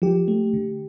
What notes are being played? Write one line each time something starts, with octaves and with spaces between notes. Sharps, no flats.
F3 G4
A3
D3